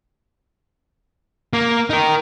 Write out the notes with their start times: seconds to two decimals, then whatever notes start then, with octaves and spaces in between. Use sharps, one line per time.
1.53 A#3
1.90 D#4 A#4